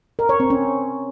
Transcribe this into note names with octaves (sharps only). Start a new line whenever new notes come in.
A#4
C#5
C4
C#4